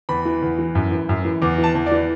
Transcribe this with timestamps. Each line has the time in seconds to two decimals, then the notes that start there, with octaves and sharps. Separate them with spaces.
0.09 E2 B5
0.25 E3
0.42 E2
0.58 E3
0.75 F#2
0.92 E3
1.09 F#2
1.25 E3
1.42 E2 D6
1.58 E3
1.64 A5
1.75 E2
1.86 D5
1.92 E3